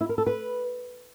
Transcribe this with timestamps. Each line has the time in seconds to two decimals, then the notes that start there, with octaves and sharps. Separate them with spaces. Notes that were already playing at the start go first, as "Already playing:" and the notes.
0.01 E4
0.09 A#4
0.18 A4
0.27 B4